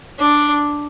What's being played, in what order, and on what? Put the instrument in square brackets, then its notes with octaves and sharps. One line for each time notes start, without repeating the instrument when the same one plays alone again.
[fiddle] D4